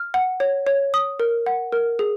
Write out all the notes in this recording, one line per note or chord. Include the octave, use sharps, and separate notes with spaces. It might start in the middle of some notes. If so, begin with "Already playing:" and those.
Already playing: F6
F#5
C#5
C#5
D#6
A#4
F#5
A#4
G#4